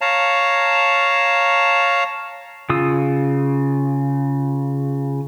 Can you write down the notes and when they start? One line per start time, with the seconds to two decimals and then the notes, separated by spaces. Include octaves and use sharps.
0.01 C#5 F5 A5 A#5
2.70 C#3 F4 D#6 E6